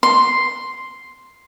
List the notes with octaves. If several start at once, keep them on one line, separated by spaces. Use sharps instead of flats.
C6